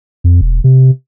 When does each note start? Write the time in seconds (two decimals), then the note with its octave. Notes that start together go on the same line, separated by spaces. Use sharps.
0.24 F2
0.41 E1
0.64 C3